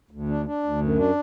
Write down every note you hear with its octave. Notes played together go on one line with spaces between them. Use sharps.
D2
D4
D4
D2
F#2
D4